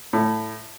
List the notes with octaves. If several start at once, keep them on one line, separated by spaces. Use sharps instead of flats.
A2